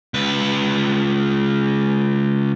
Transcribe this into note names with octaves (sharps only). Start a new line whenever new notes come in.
C#2 B4